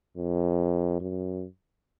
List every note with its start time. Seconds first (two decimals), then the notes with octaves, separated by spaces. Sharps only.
0.16 F2
1.00 F#2